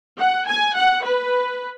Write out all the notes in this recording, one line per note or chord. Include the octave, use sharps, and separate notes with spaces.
F#5
G#5
F#5
B4